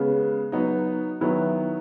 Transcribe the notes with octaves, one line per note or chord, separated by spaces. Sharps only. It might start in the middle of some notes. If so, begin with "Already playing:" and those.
Already playing: C#3 G#3 B3
F#3 B3 D#4
D#3 F#3 B3 E4